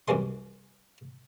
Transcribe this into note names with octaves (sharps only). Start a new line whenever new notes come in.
C2 F#2 E3 G#3 C6